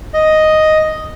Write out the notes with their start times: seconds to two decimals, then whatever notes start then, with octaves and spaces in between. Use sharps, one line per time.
0.14 D#5